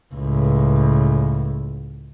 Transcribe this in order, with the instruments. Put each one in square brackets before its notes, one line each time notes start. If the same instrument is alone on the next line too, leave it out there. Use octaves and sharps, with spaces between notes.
[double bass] C#2 A2